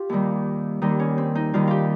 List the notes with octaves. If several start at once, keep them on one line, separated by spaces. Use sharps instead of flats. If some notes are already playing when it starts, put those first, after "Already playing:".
Already playing: F4 G4
D#2 D#3 G3
D#2 D#3 G3 D#4
C#4
C4
D#4
D#2 D#3 G3 F4
F4 G4